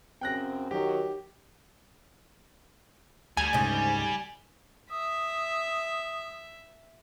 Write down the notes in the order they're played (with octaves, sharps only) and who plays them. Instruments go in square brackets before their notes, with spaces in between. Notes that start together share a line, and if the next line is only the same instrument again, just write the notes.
[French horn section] F#2 C#3 C4 [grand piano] G5 F#6 A#6
[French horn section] D#3 F#3 [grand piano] G4
[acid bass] D2 [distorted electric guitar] G3 [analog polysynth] G#5
[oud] G#2 C#3
[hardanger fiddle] E5 [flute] D#6